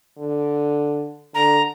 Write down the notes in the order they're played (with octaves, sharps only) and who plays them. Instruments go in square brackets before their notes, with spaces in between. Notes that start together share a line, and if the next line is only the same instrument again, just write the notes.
[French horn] D3
[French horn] D3 [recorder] A#5